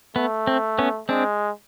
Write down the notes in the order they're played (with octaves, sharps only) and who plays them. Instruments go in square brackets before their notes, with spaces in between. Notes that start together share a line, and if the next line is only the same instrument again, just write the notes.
[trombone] A3 [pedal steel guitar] B3
[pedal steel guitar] C4
B3 C#4
[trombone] G#3 [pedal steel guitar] C4 D4